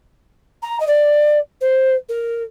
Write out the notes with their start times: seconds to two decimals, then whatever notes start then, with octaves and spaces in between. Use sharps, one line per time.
0.62 A#5
0.80 D#5
0.87 D5
1.61 C5
2.09 A#4